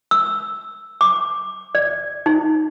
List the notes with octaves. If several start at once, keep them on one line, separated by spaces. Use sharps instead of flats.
E6
D6
D5
D#4